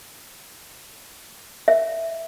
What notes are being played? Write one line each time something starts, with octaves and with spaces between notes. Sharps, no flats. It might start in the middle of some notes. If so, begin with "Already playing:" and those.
E5